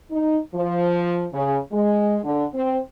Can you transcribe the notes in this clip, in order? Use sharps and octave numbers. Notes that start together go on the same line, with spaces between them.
D#4
F3
C#3
G#3
D3
C4